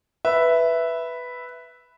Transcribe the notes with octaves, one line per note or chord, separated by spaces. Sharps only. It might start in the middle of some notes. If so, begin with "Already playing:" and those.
B4 E5